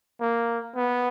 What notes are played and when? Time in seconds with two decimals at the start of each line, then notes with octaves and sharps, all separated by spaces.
0.21 A#3
0.76 B3